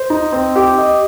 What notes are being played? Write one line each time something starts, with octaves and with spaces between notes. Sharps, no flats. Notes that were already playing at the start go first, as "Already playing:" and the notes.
Already playing: C5
D#4
C4
G4
D#5